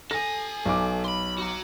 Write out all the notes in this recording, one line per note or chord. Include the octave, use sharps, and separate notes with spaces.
A4 G#5 A#6
B1 D6
B5 C6
F#4 A#5